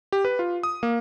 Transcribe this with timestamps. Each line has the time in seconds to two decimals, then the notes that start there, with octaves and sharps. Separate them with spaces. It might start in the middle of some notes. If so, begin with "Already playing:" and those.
0.12 G4
0.25 B4
0.39 F4
0.63 D#6
0.83 A#3